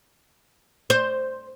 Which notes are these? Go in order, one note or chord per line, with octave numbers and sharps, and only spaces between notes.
C5